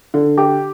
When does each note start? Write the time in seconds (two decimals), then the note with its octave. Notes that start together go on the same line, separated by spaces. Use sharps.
0.14 D3
0.38 G4